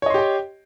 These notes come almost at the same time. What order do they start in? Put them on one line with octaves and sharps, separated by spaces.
C#5 D#5 C6 G4 G5